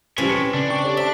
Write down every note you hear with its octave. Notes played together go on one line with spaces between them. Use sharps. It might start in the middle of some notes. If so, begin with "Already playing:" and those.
C#2 F3 G3 C4 C#4 A4 B4 C#5
C#7 E7
C#3 D4
G5 C#6
G4 A4 C#5
C5 E5 A5